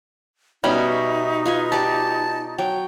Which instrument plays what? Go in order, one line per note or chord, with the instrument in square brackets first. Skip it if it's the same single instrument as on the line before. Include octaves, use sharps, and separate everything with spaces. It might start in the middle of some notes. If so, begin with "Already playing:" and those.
[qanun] B2 [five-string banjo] G3 C#4 [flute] D#4 [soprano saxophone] E5
[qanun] F4 B4 G#5
[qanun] G4 D5 [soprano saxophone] A5
[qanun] F#3 [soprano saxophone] G5